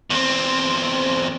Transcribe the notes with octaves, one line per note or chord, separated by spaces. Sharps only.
E2 C4